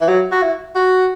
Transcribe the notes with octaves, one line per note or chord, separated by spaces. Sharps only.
E3
F#3
F#4
E4
F#4